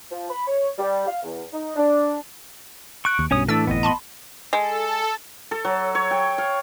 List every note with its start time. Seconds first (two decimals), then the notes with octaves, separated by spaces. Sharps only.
0.11 F3
0.30 B5
0.46 C#5
0.78 G3
1.07 F5
1.23 E2
1.53 D#4
1.76 D4
3.05 C#6 F#6 D7
3.19 D#2
3.31 B1 G2 B2 C#4 C#5 D#6
3.48 A2 E3 A3 D4 E6 A6
3.67 G1 F2 B3 D#5
3.83 A5 B5 C6
4.53 G#3 A4
5.51 A4
5.65 F#3
5.95 C#5
6.11 G5
6.38 F5